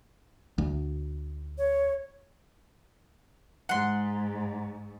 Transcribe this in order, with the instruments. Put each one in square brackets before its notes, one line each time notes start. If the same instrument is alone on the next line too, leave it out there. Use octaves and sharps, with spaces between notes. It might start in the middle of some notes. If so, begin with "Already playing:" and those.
[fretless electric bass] D2
[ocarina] C#5
[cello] G#2 [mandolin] F#5 C6